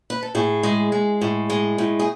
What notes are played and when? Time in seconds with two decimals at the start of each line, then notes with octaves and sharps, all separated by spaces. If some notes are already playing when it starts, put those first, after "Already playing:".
0.10 B4
0.23 A4
0.35 A2 G#4
0.63 G#3
0.92 G#3
1.21 A2
1.50 G#3
1.78 A2
1.99 G#4